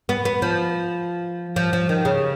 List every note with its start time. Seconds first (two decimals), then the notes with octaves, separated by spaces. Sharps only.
0.09 B3
0.25 B3
0.42 F3
1.56 F3
1.73 F3
1.89 D#3
2.05 C#3